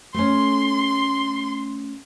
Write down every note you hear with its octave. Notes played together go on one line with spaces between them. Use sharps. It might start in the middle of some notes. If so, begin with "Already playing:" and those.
A3 C#4 C6